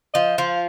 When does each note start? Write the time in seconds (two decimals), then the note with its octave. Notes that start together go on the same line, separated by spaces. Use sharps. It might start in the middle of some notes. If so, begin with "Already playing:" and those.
0.14 F3 D#5
0.38 F3 F5